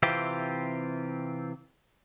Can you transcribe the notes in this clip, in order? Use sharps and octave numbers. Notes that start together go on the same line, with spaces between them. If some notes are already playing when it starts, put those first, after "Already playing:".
C3 E3 C4 F4 G4